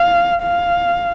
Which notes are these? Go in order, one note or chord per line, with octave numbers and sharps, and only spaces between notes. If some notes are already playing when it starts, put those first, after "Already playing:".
Already playing: F5
F5